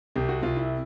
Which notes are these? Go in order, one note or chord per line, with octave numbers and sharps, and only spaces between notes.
C2 G4
F#4
C2 F4
E4